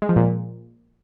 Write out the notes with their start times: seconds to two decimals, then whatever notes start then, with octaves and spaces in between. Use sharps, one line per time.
0.02 G#3
0.09 F3
0.16 A#2